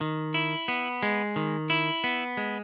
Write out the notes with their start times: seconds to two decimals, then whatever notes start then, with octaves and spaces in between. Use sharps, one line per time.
0.01 D#3
0.34 E4
0.68 B3
1.03 G#3
1.36 D#3
1.70 E4
2.04 B3
2.37 G#3